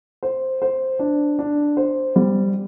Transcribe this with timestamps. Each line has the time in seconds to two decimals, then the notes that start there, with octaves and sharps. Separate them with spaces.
0.23 C5
0.62 C5
0.99 D4
1.39 D4
1.77 C5
2.16 G3